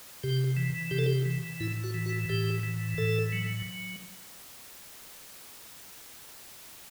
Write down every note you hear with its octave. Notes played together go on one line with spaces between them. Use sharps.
C3 G4
E3
C3 G4
A4
G4
E3
A2 E4
F#4
E3
F#4
A2 G4
E3
A2 A4
F#3